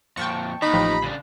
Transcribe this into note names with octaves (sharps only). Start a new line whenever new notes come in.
F2 A#2 G5 A5 C#6
D#2 D#3 D#4 B5
A1 F3 G4
C#3 D4